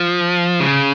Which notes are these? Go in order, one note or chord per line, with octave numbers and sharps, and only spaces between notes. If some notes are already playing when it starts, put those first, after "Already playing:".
Already playing: F3
C#3